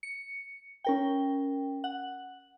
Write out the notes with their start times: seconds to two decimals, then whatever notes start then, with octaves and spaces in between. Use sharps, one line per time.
0.03 C#7
0.84 C#4 A#4 G5
1.84 F#5